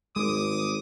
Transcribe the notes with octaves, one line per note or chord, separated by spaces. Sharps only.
G#1 G#3 D6 D#6